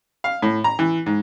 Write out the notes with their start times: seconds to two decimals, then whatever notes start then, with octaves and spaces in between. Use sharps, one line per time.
0.24 F5
0.42 A2
0.64 A#5
0.79 E3
1.06 G#2